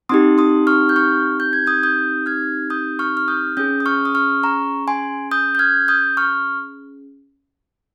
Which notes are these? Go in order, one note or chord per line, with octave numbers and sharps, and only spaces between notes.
C4 D#4 G4 C6 D#6
C6 D#6
C#6 F6
G6
C#6 F6
G6
G#6
D#6 G6
D#6 G6
F6 G#6
D#6 G6
C#6 F6
F6
D#6 G6
C#4 G#4 D#6 G6
D#6
C#6 F6
D#6
C#6 F6
A#5 C#6
G#5 C6
D#6 G6
G6
F6 G#6
D#6 G6
C#6 F6